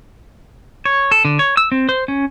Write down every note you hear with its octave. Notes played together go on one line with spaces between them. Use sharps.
C#5
A4
D3
C#5
E6
C4
C5
C#4